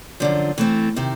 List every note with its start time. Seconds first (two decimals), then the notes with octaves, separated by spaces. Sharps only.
0.20 F#2 D3 F3
0.58 E3 A3 C4
0.96 C3 D#3